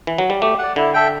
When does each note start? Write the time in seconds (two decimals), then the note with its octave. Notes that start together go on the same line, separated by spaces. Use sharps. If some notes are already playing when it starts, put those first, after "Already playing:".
0.07 E3
0.18 F#3
0.30 G3
0.42 A3 G4
0.58 D5 F#5
0.76 D3 E4
0.94 A4 E5 G5